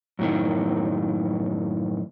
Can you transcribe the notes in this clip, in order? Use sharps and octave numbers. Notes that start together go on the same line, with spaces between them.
F#2 A2 D#3